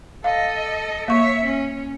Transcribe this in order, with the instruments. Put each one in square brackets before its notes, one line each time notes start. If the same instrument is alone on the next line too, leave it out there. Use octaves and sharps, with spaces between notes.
[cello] A4 D#5 [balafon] F5
[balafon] A#3 C#6 [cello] C#5 E5
[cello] C#4